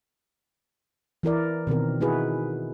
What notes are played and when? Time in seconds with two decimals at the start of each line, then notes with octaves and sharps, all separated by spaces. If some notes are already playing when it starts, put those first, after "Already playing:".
1.23 E3 E4 A#4 D5
1.67 B2 D#3 C4 A#4
2.01 D#4 E4 F#4 G#4 B4